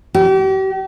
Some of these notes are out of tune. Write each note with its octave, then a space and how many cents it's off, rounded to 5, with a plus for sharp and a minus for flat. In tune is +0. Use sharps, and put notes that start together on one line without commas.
G4 -40